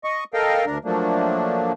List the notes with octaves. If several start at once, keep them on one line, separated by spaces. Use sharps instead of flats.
D#5 C#6
A4 A#4 D#5 F5 G5
D2 D4 A#4
F3 F#3 A3 A#3 D4